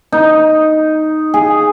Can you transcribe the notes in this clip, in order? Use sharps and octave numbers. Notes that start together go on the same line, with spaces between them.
D#4
G#4